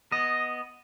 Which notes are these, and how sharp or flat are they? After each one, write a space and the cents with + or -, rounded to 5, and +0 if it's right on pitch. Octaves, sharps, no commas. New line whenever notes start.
B3 +0 D#5 +0